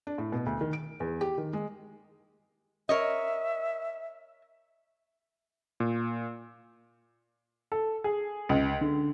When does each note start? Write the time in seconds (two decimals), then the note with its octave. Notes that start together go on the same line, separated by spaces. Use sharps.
0.07 D4
0.18 A2
0.32 B2
0.46 D2
0.61 D#3
0.73 D7
1.00 E2
1.21 G4
1.38 D#3
1.53 G#3
2.89 A#4 C#5 D#5 E5
5.80 A#2
7.72 A4
8.04 G#4
8.49 C#2
8.81 D3